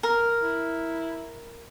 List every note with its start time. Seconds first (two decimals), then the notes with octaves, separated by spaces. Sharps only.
0.03 A#4
0.41 E4